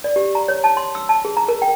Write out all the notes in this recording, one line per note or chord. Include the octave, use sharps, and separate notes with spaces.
D5
G4
A#5
C#5
A5
C6
E6
A5
G#4
A#5
A#4
G5